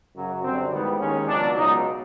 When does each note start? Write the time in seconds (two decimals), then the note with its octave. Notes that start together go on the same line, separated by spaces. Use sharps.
0.16 F#2 C#3 F#3
0.44 F#2 D3 G3 C4
0.71 A1 G#2 D#3 G3 B3
1.00 D#2 D#3 G#3 C#4
1.28 C#2 B2 F#3 D4
1.57 C#2 B2 F#3 D#4